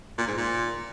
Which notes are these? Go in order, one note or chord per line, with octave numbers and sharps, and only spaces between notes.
A#2
G#2
A#2